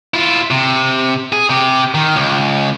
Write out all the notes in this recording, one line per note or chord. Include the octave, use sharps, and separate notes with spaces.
E4 F4
C3
G#4
C3 G4
D#3
C#2